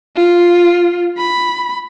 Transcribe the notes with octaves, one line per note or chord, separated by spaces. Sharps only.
F4
B5